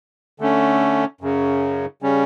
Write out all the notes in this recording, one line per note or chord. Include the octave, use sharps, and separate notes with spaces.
D3 A3 C#4
F#2 C#3 F#3
C#3 G3 C#4